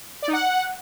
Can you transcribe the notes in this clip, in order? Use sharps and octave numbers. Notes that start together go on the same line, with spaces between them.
D5
D#4
F#5